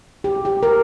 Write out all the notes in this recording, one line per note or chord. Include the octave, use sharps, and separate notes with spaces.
G4
G4
A#4